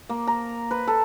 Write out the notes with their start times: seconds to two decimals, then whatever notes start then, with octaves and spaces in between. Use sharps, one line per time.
0.09 A#3
0.27 A#5
0.71 B4
0.87 A4